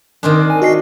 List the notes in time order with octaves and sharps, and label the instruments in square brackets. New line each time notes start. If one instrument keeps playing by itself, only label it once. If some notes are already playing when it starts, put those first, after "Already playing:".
[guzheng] D#3 C4 D4
[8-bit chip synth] G#5
F#4 D#5 C7